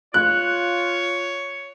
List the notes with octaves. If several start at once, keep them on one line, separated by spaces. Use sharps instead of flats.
F4 C#5 F#6